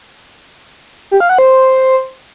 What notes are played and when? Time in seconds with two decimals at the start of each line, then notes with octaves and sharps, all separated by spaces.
1.11 G4
1.20 F5
1.29 F#5
1.38 C5